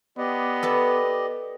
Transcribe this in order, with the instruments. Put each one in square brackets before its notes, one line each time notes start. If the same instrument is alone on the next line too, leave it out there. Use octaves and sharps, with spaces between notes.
[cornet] B3 [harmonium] G4 D5 D#5
[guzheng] A4 B4 A5